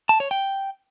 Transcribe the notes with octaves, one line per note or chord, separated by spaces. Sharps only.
A5
C#5
G5